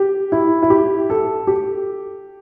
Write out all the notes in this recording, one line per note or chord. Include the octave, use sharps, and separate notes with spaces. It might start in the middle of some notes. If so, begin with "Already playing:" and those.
Already playing: G4
E4
E4
G4
A4
G4